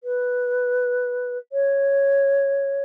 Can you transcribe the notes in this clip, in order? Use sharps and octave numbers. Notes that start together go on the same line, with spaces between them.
B4
C#5